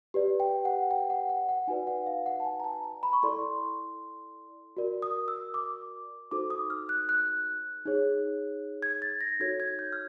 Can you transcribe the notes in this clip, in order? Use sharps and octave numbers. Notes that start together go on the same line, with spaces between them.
G4 B4 D5
G5
F#5
G5
F#5
F#5
F#5
D#4 F#4 B4 D5 G#5
F#5
F5
F#5
A5
G#5
A#5
A5
A#5
B5
C#6
E4 A4 D5 C6
F#4 A#4 D5
D#6
E6
D6
D#4 F#4 A4 C5 D6
D#6
F6
F#6
F#6
D#4 G#4 C#5
G#6
A6
A#6
D#4 F#4 A4 C#5 G#6
G#6
G6
F6